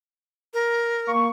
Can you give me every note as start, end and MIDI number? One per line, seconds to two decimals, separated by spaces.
0.54 1.11 70
1.08 1.28 58
1.08 1.28 85